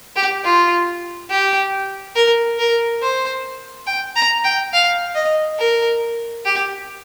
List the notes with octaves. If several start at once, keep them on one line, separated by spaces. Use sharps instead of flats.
G4
F4
G4
A#4
A#4
C5
G5
A#5
G5
F5
D#5
A#4
G4